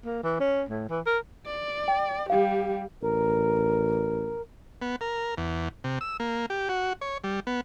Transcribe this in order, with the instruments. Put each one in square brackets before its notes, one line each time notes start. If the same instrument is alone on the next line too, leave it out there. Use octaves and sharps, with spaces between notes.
[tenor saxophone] A#3
E3
C#4
A2
E3
A#4
[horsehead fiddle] D5
[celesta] G5
[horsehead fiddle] G3 G4 [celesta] F5
[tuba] A1 [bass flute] A#4
[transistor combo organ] B3
A#4
E2
C3
E6
A#3
G4
F#4
C#5
G3
B3